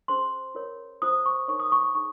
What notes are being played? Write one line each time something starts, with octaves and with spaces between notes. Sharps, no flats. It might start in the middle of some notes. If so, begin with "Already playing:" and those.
C#4 G#4 C5 C6
F4 A#4 C#5
F4 C5 D#6
C#6
D#4 A#4 C#5 C#6
D#6
C#6
C#6
D#4 G#4 C#6